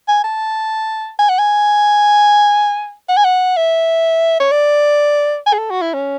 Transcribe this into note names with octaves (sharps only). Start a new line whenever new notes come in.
G#5
A5
G#5
F#5
G#5
F#5
G#5
F#5
E5
C#5
D5
G#5
G#4
A4
F#4
E4
C#4